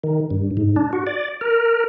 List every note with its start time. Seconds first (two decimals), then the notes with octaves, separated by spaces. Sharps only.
0.04 D#3
0.30 G2
0.57 G#2
0.76 D4
0.93 F#4
1.07 D5
1.41 A#4